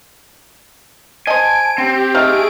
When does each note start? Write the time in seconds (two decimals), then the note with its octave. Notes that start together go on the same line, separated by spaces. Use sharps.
1.27 C5 D#5 G#5 A5 D7
1.78 C4 G4 G5
2.14 A3 D#4 G#4 F5 D7